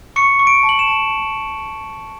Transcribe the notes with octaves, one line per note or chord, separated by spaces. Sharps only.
C#6 C#7
C#6
D7
A5
F#7
E7
A5